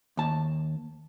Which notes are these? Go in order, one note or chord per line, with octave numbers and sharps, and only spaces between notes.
D#2 A5